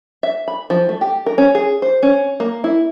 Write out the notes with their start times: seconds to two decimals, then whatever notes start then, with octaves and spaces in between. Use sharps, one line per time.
0.23 E5
0.48 B5
0.70 F3
0.89 A3
1.01 G4
1.26 A#4
1.38 C#4
1.55 G#4
1.82 C5
2.03 C#4
2.40 A#3
2.64 E4